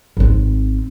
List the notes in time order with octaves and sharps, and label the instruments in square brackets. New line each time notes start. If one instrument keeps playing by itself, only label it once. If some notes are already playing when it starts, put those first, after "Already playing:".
[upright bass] G#1 C4